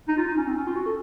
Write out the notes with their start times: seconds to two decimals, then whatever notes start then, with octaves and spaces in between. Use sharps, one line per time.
0.08 D#4
0.17 F4
0.27 D#4
0.37 C#4
0.47 C4
0.57 C#4
0.67 F4
0.75 F#4
0.86 A4